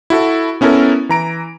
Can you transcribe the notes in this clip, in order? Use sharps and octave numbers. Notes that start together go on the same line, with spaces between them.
E4 F#4 A4
B3 C#4 E4 A4 A#4
E3 A#5 D7